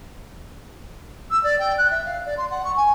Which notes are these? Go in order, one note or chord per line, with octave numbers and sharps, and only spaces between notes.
E6
D5
G5
F#6
E5
F5
D5
C6
F#5
C#6
G#5